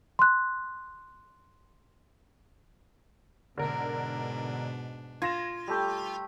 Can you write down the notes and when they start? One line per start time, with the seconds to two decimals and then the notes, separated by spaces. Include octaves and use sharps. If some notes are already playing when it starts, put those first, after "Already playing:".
0.19 C6 F#6
3.58 G#2 B2 D3 D4 A#4
5.22 F4 G#6 A#6 E7
5.67 G3 A3 G4